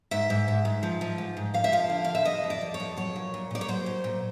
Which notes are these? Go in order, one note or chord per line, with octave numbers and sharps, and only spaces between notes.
G#2 E5
G#2
G#2
G#2
F3
F3
G#2
G#2
F2 F5
E5
F3 F5
D3
F2 F5
E5
F2 D#5
F2
D5
F2
C#5
F2
F#3 C#5
A#2
A#2
A#2 D5
C#5
F#3 C5
A#2
A#2